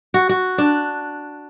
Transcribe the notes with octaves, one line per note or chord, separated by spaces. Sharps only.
F#4
F#4
D4